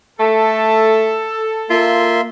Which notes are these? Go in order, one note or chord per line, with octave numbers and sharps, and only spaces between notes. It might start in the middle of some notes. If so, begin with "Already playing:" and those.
A3 A4
A#3 F4 E5 C6